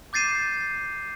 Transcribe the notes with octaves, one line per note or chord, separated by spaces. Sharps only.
D6 G6 A6 C7 D#7 E7